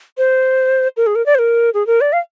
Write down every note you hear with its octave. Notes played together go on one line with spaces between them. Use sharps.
C5
A#4
G#4
A#4
D5
C5
A#4
G#4
A#4
D5
F5